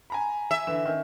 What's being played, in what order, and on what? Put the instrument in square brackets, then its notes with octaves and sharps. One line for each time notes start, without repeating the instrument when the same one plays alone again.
[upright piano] G#5 A#5 B5
[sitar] E5
[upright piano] D3 E3 E7
D#3 C#4